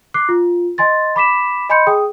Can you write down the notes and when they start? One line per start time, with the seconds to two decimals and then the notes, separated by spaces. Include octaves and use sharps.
0.14 D6 F#6 C7
0.29 F4
0.78 D#5 G#5 C6 A6
1.16 B5 D6 B6 E7
1.69 D#5 G#5 B5 C6 G6 C#7
1.87 G#4 G5 D#6